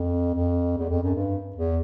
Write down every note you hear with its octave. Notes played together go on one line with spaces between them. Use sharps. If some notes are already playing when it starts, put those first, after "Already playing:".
Already playing: F2
F2
E2
F2
F#2
G2
E2